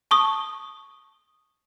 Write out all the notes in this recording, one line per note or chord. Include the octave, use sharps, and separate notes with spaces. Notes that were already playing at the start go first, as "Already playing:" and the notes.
A5 C#6 D#6